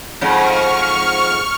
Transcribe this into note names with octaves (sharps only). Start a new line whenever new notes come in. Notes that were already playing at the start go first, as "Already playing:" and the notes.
F2 G#2 C#6 F6